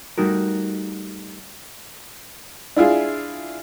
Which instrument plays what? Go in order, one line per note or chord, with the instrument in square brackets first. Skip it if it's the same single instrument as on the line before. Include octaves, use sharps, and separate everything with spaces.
[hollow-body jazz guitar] G3 A3 D#4 F#4 A#4
[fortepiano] D4 E4 F4 G#4